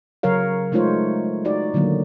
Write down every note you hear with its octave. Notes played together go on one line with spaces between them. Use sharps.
C#3 F#3 A#4 C#5 F5
G#3 A3 D#4 F4 C5 C#5
D#4 F#4 D5
A#2 D3 D#3 F#3 A#3